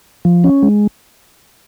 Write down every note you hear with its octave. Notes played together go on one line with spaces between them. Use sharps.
F3
C#4
G#3